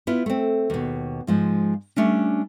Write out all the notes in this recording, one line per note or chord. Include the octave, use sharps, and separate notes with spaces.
B3 E4 F4
A3 C4
D#2 B2
G#2 F3 G#3
G3 A3 C#4 D4